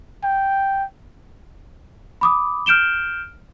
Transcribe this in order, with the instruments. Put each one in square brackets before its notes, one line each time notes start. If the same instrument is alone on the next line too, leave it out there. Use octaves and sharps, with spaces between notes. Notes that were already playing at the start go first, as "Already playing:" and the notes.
[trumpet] G5
[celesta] B5 D6 D#6
F6 G6 D7 E7 G7